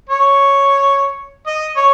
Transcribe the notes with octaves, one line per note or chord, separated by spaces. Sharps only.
C#5
D#5
C#5